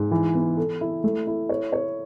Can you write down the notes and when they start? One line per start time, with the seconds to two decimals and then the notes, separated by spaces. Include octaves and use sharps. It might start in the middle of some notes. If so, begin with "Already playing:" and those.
Already playing: G#2
0.11 E3
0.35 B3
0.57 A4
0.81 E4
1.04 A3
1.27 E4
1.49 C#5
1.73 C#5